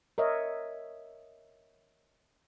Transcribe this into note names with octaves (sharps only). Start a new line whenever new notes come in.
A#4 C#5 D#5 E5